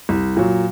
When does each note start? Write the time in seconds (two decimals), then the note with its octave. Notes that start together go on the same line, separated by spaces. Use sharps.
0.09 C2
0.37 A#2 F#3